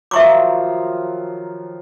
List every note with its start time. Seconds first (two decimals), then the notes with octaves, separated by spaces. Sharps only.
0.11 D#3 F3 F#3 E5 C#6 D6